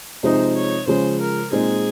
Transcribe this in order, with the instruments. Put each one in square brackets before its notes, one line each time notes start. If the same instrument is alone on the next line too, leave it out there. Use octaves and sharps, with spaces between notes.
[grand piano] C3 F3 G#3 C4 D#4 [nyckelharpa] C5
[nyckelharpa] C#5
[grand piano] C#3 F3 G#3 C#4 [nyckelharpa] C5
[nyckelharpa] A#4
[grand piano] A#2 G#3 C4 D#4 [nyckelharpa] G#4